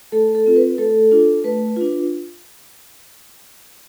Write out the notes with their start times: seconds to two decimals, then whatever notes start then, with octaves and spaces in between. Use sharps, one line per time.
0.12 A3 A4
0.35 A4
0.46 C4 F4
0.56 B4
0.78 A3 A4
1.12 D4 F4
1.44 A3 B4
1.76 D4 F4